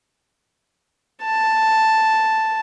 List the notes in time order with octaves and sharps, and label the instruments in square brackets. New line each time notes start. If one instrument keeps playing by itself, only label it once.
[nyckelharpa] A5